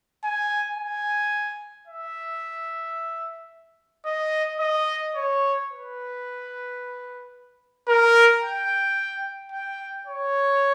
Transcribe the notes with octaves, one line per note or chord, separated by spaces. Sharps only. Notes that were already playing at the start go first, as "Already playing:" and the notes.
G#5
G#5
E5
D#5
D#5
C#5
B4
A#4
G5
G5
C#5